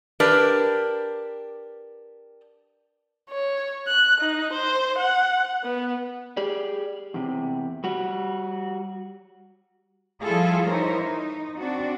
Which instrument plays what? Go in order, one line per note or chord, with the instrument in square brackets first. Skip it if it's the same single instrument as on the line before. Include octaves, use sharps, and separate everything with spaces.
[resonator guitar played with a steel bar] D4 G4 A#4 B4
[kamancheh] C#5
F#6
D#4
C5
F#5
B3
[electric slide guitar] G4 G#4 D5
E2 C3
G3 F#4
[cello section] F3 G3 E4 F4 G#4 A4
E3 D#4 E4 A#4 C5 C#5
D#4
C4 D4 F#4